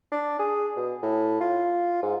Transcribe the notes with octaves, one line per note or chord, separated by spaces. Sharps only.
D4
G#4
B2
A2
F4
G#2